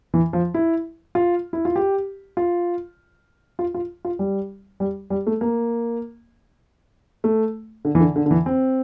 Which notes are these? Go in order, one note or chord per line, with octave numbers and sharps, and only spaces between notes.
E3
F3
E4
F4
E4
F4
G4
F4
F4
F4
F4
G3
G3
G3
A3
A#3
A3
D3
E3
D3
D3
D3
E3
C4